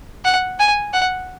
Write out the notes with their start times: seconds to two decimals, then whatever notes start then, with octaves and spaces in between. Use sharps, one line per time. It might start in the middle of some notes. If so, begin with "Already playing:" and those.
0.25 F#5
0.59 G#5
0.93 F#5